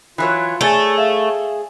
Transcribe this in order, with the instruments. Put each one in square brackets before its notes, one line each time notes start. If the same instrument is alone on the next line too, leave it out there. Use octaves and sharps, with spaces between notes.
[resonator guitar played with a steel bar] E3 F#3 C#5 [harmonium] F4
[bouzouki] A3 [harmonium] G#4 [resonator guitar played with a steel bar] C#5 [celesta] D5 G#5 A6
[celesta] E5 F5 E7